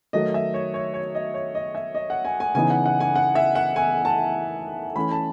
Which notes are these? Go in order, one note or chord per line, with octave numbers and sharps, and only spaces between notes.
D#3 F#3 A3 D#5
E5
C#5
C#5
C#5
D#5
C#5
D#5
E5
D#5
F#5
G#5
G#5
C#3 E3 B3 D#4 G#5
F#5
F#5
G#5
F#5
E5
F#5
G#5
A5
E3 A3 C#4 B5
A5